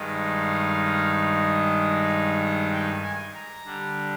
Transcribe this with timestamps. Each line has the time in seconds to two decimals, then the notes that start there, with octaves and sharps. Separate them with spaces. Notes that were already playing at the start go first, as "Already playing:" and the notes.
Already playing: G2 D#3 G#3 D#4
0.39 F5
2.72 G5
3.03 G#5
3.34 A#5
3.65 D3 G3 D4